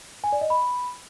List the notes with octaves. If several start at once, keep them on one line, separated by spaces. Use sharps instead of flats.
G#5
D5
D#5
B5